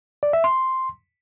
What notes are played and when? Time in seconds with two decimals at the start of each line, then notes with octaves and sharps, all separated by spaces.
0.23 D5
0.33 E5
0.44 C6